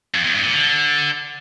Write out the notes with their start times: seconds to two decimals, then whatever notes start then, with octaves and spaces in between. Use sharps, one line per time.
0.14 F2
0.24 E2
0.34 G2
0.44 A#2
0.54 D3